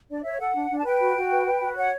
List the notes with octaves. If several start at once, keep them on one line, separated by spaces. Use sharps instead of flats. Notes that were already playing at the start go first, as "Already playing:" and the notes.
D4 D5
C#5 E5
A4 F#5
D4
D4
A5
B4 G5
F#4
F#4
B4
B4
F#4
C#5 F#5